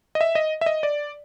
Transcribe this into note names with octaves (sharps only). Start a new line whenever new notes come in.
D#5
E5
D#5
E5
D#5
D5